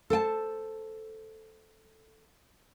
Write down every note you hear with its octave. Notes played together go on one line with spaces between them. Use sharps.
A4 C5 G5 A5